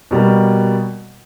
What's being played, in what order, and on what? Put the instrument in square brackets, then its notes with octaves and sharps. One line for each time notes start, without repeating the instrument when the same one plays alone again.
[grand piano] B2 G3 A#3